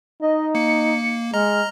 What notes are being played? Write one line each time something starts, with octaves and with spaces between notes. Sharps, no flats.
D#4 D#5
A#3 C#7
G#3 D#5 A#5 F6